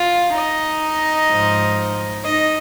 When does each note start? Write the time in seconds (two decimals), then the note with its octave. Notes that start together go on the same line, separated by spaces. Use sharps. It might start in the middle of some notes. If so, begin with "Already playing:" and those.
Already playing: F4 F5
0.36 D#4 D#5
1.30 G#2 F3
2.25 D#4 D#5